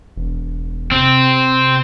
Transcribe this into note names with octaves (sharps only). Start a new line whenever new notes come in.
E1
C3 C4